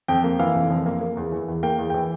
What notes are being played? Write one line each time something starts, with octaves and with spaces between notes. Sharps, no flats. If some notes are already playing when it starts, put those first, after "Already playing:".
F2 G5
A#3
E3 F5
F1
F2
A#3
A#3
E2
E3
E2
A#3 G5
E2
E3 G5